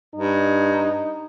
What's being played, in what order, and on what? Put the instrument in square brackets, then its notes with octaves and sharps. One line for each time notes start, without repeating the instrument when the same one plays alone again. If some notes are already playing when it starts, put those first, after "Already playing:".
[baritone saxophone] G2 [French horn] D#4